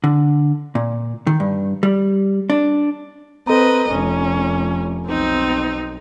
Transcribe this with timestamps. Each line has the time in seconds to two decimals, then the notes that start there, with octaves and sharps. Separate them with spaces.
0.04 D3
0.75 A#2
1.27 D#3
1.40 G2
1.83 G3
2.50 D4
3.47 C4 A4 B4 D#5 A#5
3.91 F1 C#4
5.07 B1 C4 D#4